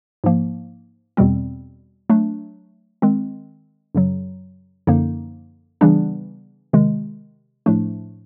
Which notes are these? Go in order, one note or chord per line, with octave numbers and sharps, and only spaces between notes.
G#2 F3 A#3
E2 B2 G3 C4
F#3 A3 D4
D#3 G#3 C4
F#2 C#3 F#3
F#2 D3 F3 A#3 D#4
C#3 E3 G3 B3 D4
C3 D#3 G#3
A2 F3 A3 D4